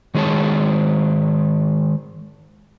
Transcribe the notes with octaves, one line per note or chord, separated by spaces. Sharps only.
D#3 G#3 F4 G#4 C#5 A5